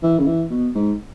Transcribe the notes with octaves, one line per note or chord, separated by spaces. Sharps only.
E3
C#3
E3
B2
G#2